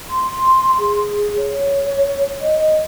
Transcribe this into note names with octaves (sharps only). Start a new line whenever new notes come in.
C6
G#4
C#5
D#5